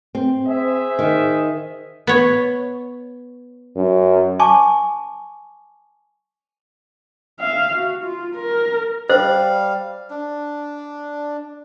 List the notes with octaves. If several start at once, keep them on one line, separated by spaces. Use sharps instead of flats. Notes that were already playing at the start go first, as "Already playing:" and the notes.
C4
G#4 C5 E5
D#3
B3 C#5
F#2
G#5 A5 C#6 D6
E5 F5
F#4
F4
A#4
G3 C5 F5
D4